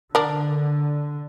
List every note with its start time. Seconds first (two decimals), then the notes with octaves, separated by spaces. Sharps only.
0.15 D3 D4 A#4